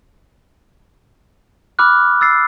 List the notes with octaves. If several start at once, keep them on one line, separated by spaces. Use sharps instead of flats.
B5 D6 F6 F#6
E6 A6 C7